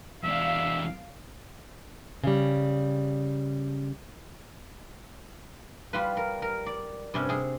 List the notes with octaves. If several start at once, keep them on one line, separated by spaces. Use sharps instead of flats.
E2 D4 E5 F5
C#3 G3
G3 F4 B4
A#4
A#4
D5
G2 C3 C#4
C3 G#4